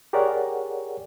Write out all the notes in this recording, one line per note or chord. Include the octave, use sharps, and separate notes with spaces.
G4 G#4 A#4 C#5 D5 F#5